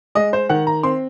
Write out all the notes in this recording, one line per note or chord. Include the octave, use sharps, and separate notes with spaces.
G#3 D#5
C5
D#3 F#5
A#5
C4 C6